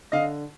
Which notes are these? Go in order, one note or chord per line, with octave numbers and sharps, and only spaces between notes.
D3 D#5 F5